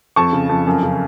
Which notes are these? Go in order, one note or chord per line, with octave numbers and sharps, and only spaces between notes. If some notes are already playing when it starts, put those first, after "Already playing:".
F2 A5 C#6
C#3
F2
F#2
C#3